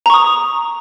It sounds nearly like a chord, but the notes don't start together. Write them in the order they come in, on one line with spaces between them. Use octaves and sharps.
A#5 C#6 D#6